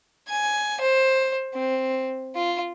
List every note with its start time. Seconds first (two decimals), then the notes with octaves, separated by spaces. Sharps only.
0.29 G#5
0.81 C5
1.55 C4
2.36 F4